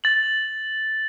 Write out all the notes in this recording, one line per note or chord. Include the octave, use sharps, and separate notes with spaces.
A6 F#7